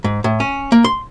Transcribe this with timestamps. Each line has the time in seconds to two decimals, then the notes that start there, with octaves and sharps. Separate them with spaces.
0.04 G#2
0.24 A2
0.40 C#4
0.72 A#3
0.84 C6